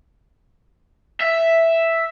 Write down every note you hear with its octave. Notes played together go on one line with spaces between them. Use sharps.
E5